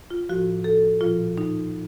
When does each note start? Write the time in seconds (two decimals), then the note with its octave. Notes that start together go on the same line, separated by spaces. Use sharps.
0.10 F4
0.29 A2 F3 F#4
0.64 A4
1.01 A#2 F3 F4
1.38 D#4